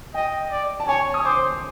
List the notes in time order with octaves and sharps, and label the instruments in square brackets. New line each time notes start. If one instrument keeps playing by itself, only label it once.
[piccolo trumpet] D#5 [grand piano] G5
[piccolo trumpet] D5
[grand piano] A5
[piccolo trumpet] C#5 [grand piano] G#5
[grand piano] D#6
[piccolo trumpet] C5 [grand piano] D6